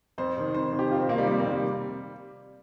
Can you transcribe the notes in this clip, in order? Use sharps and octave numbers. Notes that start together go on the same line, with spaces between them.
F2 C5
C3 D#3
F2 C5
C3 D#3
G4
F2 F4
C4
C3 D#3 A#3
G3
F2 A#3
A#3
C3 D#3
G3